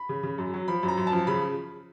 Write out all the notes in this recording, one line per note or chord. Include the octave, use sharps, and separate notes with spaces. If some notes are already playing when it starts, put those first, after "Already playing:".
Already playing: B5
C#3
C#3
F#2
F#3
F3 B5
F#2
A#5
F#2
A5
F3
C#3 B5